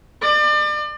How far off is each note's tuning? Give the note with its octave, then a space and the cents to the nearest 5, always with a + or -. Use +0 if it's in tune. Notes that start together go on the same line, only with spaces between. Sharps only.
D5 +35